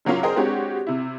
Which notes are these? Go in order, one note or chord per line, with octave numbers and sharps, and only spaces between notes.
C#3 F#3 A#3 C#4 F4
G#4 A#4 C5 D#5 G5 A#5
G#3 C4 D4 F#4 G4 C#5
C3 E4